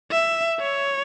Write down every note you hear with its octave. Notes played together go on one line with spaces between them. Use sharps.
E5
C#5